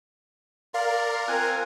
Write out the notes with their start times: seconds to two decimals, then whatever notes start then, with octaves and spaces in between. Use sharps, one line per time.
0.74 A#4 D5 F5 C6
1.28 C4 F4 G#5 F#6